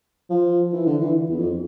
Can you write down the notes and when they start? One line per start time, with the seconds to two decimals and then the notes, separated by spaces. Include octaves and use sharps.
0.30 F3
0.73 E3
0.86 D3
1.01 E3
1.29 E2
1.39 F2